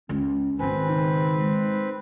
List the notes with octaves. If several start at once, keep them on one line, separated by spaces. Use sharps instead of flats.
C#2 C#4
G#1 D#3 C4 B4 G#5
C#3 D#4
G#3